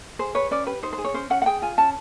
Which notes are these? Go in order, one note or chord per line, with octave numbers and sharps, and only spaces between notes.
G#4 C5
B4 C#5
C#4 D5
G4 B4
D#4 C5
C5
G#4
C#5
C#4 C5
C#4 F#5
F#5
G#4 G5
F4 G#5
C#4 A5